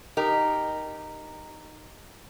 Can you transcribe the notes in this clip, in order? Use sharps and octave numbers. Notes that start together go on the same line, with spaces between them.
D#4 G4 A#4